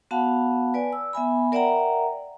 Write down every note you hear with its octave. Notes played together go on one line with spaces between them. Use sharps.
B3 F#4 F5 F#5 A5 B5
B4 D5 G#5
E6
B3 E5 G#5 B5
A#4 D5 E5 F#5 G5 A#5